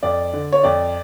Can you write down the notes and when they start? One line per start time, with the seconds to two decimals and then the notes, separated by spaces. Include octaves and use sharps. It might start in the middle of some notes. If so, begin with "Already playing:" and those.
0.03 F2 D5
0.33 D3
0.53 C#5
0.63 F2 D5